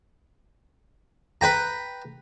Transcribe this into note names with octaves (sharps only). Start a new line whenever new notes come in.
B4 G5 A#5